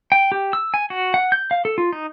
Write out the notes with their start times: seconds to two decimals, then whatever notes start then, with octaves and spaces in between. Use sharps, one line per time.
0.12 G5
0.32 G4
0.53 E6
0.74 G#5
0.90 F#4
1.14 F#5
1.32 G6
1.51 F5
1.65 A4
1.78 F4
1.93 D#4